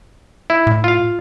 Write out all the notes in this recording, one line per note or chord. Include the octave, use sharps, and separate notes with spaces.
E4
A2
F4 F5